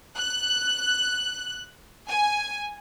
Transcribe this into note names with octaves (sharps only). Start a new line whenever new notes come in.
F#6
G#5